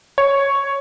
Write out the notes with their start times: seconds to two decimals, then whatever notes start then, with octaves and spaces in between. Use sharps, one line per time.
0.18 C#5